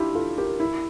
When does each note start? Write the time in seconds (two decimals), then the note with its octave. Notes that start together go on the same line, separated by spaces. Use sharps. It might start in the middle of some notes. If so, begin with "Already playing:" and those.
Already playing: D4 E4 F4 G4
0.15 F4 A4
0.38 G4 A#4
0.60 E4